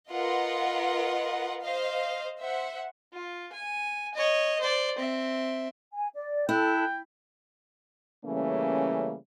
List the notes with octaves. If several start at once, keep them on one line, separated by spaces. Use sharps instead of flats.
F4 A#4 B4 D#5 F#5
C5 D#5 F5
C5 E5 F#5
F4
G#5
C#5 D#5
C5 D5
C4 E5
G#5
D5
E4 A4 G5 F#6
C#3 E3 G3 A3 A#3 C#4